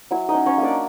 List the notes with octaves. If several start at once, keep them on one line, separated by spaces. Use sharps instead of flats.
F#3 E4 E5
D#4 D#5
C#4
C#4 C#5
A#3
D4 D5